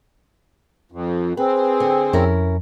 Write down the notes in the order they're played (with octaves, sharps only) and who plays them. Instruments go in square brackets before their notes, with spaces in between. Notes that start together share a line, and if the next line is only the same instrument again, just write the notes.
[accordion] F2
[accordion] C4 [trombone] G#4 [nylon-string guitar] B4
[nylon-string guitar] D3
[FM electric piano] F2 [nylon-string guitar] C#4 E4 A#4